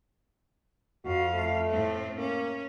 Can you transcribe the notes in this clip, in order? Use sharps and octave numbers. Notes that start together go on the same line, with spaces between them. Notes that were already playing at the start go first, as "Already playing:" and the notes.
F2 F#4 F5
A3
A2 C4
A#3 C#4